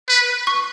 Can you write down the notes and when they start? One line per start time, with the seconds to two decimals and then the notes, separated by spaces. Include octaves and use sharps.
0.09 B4
0.47 C#6